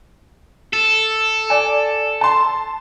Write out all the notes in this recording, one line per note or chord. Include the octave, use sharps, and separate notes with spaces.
A4
D5 G#5
A5 C6